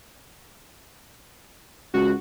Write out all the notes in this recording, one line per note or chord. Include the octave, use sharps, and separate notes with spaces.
C#2 F#4